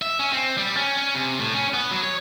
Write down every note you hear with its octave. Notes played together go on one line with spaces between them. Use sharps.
E5
C#4
C4
G3
C#4
C#4
C3
A2
C#4
B3
F#3
C#5